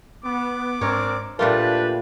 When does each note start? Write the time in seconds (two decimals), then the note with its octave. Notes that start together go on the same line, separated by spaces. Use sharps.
0.24 B3 D6
0.81 G#2 C4 D4 A#4 C#5
1.39 A#2 A3 D4 F4 G4 A#4 B4 A5